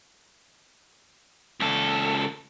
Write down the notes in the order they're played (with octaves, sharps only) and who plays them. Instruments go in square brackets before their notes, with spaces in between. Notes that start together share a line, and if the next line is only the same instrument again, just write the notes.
[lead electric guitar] C#2 A4